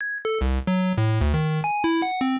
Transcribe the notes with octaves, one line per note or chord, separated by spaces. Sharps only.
G#6
A4
C2
F#3
A2
D2
D#3
G#5
E4
F#5
C4